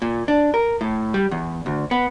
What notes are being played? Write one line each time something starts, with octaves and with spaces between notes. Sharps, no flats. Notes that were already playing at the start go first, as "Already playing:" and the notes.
A#2
D4
A#4
A2
G3
E2
D2
B3